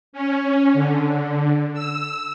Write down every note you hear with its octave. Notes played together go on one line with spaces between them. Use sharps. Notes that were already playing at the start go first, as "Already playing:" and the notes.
C#4
D3
E6